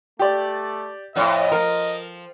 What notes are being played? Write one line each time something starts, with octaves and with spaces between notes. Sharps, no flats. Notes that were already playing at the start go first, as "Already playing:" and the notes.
A3 G4 D5
F2 A2 D#5
F3 A#4